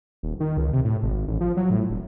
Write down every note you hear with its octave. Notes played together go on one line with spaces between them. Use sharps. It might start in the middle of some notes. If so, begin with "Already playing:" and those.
D#1
D#3
C#2
C3
A2
G#1
A1
F3
F#3
A2
E1